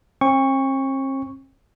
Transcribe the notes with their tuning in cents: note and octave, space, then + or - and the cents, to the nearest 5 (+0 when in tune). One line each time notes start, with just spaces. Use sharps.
C4 +45 G5 +45 C#6 +0